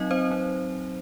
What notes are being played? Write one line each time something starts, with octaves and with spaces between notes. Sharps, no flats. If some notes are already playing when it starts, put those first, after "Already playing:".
Already playing: F#3 C4 D#4 D#5
C4 C5
F#3 C4 D#4